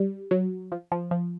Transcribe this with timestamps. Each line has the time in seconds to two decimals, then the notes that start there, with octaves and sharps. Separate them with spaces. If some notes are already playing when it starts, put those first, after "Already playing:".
Already playing: G3
0.31 F#3
0.72 F3
0.92 F3
1.11 F3